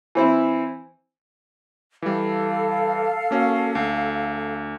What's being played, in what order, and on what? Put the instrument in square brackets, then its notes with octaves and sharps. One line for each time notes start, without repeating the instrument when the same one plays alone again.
[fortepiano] E3 C4 E4
[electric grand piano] E3 G3 [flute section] A4 F5
[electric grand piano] A#3 C#4 F#4
D2